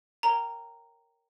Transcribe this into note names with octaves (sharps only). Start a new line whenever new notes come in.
A#4 C#5 G5 A#5